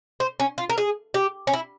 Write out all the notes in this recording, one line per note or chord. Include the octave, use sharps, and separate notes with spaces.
C5
C#4
F4
A#4
G#4
G4
C#4
E4